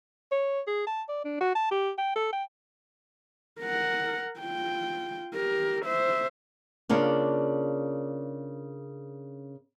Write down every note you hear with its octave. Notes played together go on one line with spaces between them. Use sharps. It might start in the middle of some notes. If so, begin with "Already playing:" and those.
C#5
G#4
A5
D5
D4
F#4
A5
G4
G5
A4
G5
A#4 F#5
F4 G5
G4 A#4
C5 E5
C#3 A#3 D4 F4